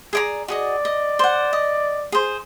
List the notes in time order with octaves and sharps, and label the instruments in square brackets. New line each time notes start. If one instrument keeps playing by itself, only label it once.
[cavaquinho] G#4 D5 A#5
[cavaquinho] F#4 G#4 D#5 [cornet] D5
[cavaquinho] D#5
C5 F#5
D#5
G#4 C5